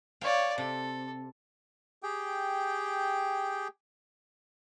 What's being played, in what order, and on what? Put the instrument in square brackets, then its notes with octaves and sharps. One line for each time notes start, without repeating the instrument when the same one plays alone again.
[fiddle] C#5 D5 [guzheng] F5 G5
[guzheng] C3 [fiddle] A4
[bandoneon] G4 G#4 G5